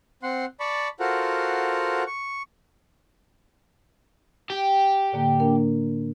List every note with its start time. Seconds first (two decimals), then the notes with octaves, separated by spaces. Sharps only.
0.23 C4 F#5 C6
0.60 D5 A5 B5 C#6
1.00 F4 F#4 A4 A#4 C5 F#5
2.07 C#6
4.50 G4
5.12 A2 D3 A#3
5.40 A#3 D4 A#4